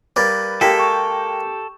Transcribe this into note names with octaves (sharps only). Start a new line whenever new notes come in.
G3 A#3 B4 D6 A6
G#3 A#3 G4 A4 G5 B6
C#6